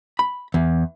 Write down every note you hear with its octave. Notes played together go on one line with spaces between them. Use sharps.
B5
E2